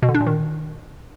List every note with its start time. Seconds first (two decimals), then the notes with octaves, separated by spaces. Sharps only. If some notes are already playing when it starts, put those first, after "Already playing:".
0.02 B2
0.08 D3
0.15 D4
0.21 A#2
0.27 D#3